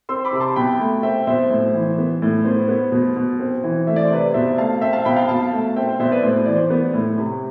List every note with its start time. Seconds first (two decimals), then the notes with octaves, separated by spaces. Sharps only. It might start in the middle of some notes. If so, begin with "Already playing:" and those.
0.09 C4 C6 E6
0.25 B5 D6
0.33 C3
0.40 A5 C6
0.56 B2 G5 B5
0.80 A3
1.03 C4 E5 G5
1.27 B2 C5 E5
1.50 A2
1.74 E3
1.98 B3
2.22 A2
2.45 B3 C5
2.69 B3
2.92 B2
3.16 B2
3.40 C4
3.64 E3
3.87 A3 E5
3.96 D5
4.05 C5
4.11 C3 B4 D5
4.34 B2 C5 E5
4.58 A3 F5 A5
4.81 C4 E5 G5
4.93 F5 A5
5.05 B2 G5 B5
5.16 F5 A5
5.28 B2 F5 A5
5.53 A3
5.76 C4 E5 G5
5.87 C5
5.99 B2 C5 E5
6.11 B4 D5
6.23 A2 C5
6.46 E3 D5
6.55 C5
6.70 B3
6.94 A2
7.18 C3